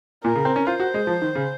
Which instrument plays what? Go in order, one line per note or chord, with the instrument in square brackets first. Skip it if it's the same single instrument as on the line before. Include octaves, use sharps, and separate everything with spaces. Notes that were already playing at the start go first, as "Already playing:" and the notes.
[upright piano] A#2 [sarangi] A#4
[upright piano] C#3
C4
C#4
[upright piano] F4 [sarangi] C5
[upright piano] F#4
G#3
F3
D#3
C#3